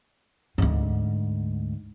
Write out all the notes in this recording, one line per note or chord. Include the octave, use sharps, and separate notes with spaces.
D2 G#2